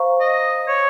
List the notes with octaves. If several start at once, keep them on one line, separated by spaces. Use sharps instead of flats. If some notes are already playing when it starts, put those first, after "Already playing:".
Already playing: C5 F5 A#5 C#6
D#5
C#5